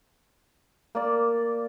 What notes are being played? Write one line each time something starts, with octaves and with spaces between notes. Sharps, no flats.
A#3 D5